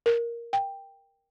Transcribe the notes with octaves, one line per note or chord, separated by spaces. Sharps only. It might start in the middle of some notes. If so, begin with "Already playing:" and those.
A#4
G5